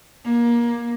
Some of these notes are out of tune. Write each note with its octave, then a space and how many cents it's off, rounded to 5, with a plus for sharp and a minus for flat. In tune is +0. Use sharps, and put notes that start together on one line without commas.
A#3 +20